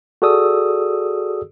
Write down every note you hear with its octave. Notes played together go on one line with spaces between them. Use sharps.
F#4 G#4 A4 D5 D#6 E6